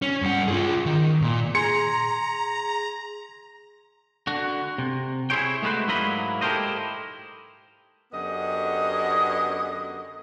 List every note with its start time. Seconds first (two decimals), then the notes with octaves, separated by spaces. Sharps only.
0.02 C#4
0.22 G2 F#5
0.48 F4 G#4
0.86 D#3
1.21 A#2
1.55 G#4 A#5 C6 C#7
4.27 D3 F#4
4.78 C3
5.30 E4 G#4 C5 C#5 G5
5.62 G#3 A3 B3 F#4 B4 C5
5.87 G#2 F#3 A#3 E4 D#5 B5
6.41 E4 G4 A4 A#4 C5 D#5
8.12 F#2 D3 B3 G4 D#5